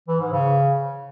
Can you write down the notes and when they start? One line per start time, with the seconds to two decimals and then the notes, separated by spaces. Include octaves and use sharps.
0.08 E3
0.20 G#2
0.31 C#3